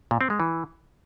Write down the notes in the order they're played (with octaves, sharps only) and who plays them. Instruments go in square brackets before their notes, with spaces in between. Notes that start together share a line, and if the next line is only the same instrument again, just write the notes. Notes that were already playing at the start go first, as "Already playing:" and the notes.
[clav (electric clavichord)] A#2
C4
G#3
E3